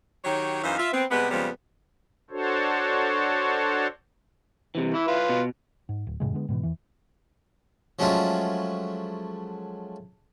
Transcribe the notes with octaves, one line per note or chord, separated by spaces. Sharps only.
D#3 F#3 G4 C#5
F#2 E3 D#4 C5 F5
F4 E5
B3 C4
C3 G3 G#3 B3
F2 C#3 F3 G3 G#3 B3
D4 F#4 A4 C5 C#5
C3 E3
E3 E4
F4 B4
B2
G#2
D1
F2 A2 C#3 G#3
D3 G#3 B3
G#2 B2 D3 E3
E2 E3
F3 F#3 G#3 A3 C#4 F4